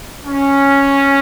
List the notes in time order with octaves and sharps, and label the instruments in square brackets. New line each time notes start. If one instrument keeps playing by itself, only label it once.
[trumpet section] C#4